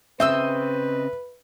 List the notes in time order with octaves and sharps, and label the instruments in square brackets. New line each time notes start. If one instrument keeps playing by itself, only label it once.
[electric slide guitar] C#3 C4 [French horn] B4 [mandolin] C5 D#5 E6 [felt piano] E5